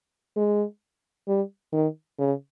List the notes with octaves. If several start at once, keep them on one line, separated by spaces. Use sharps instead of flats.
G#3
G3
D#3
C#3